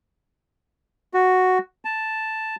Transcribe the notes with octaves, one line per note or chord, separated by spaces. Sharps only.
F#4
A5